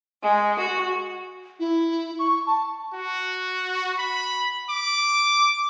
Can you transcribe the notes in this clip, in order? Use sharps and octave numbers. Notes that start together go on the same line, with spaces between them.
G#3
F#4
E4
C#6
A5
F#4
B5
D6